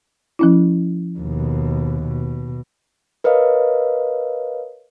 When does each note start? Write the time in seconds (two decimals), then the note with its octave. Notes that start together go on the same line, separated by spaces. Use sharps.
0.39 F3 C#4 E4
1.19 D#2 B2
2.03 B2
3.24 A#4 B4 C#5 D#5 F5